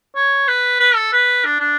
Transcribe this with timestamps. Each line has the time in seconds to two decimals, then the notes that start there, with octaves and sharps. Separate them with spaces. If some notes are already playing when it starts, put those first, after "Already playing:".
0.16 C#5
0.48 B4
0.80 B4
0.96 A4
1.13 B4
1.45 D4
1.60 D4